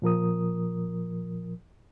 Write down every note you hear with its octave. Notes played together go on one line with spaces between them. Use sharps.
A#2 F3 A#4 D#6